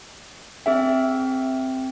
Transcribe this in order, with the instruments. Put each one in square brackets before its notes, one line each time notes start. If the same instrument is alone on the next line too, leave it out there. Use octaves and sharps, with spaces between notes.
[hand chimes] C4 G#4 G5 [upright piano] E5